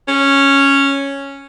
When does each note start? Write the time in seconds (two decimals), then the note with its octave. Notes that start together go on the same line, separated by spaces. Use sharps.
0.08 C#4